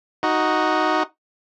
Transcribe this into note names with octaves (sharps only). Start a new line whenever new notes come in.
D#4 F#4